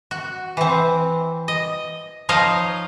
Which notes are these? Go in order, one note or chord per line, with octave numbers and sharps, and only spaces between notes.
F#4
E3 C4
D#5
F3 D#4 C#5 D#5 F5